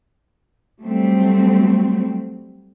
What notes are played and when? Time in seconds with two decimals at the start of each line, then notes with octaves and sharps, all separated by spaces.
0.82 F#3 G3 A3 C4